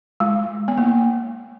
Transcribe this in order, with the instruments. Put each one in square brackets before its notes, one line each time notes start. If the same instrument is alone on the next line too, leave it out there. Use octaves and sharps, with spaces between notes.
[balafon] G#3
B3
A#3